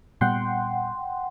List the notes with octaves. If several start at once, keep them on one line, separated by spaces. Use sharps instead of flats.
A#2 G3 B3 F#5 G5 C6